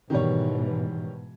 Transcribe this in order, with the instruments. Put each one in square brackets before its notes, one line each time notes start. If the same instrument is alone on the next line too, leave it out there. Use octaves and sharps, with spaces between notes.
[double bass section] G#2 B2 E3 [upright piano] D#3 G3 C#5